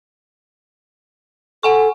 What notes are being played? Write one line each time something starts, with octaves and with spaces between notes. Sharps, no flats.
A4 F#5 G#5 C#6